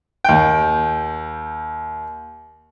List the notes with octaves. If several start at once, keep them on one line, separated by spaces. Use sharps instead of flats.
D#2 G5